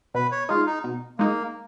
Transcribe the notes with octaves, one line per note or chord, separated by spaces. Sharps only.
B2 B4
C#5
G#3 D#4 F4
D#4
B2
G#3 A#3 D#4